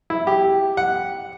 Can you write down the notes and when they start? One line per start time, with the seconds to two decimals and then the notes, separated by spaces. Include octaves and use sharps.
0.10 E4
0.27 G4
0.77 F#5